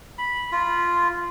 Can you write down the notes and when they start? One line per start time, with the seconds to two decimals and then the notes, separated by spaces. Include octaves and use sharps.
0.18 B5
0.52 F4